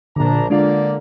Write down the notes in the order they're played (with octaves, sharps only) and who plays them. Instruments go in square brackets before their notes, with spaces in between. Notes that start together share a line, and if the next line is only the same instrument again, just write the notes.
[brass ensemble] A#1 D4 A#5 [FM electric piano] A#2 D3
[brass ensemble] D3 A#3 D5 [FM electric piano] G#3 D4 F4